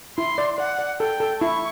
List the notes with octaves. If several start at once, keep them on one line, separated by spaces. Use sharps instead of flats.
E4 C6
D5
D5 F#5
D5
A4 G5
A4
E4 C#6